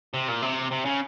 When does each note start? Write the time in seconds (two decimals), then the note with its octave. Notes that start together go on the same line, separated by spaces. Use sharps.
0.14 C3
0.28 A#2
0.42 C3
0.71 C3
0.85 C#3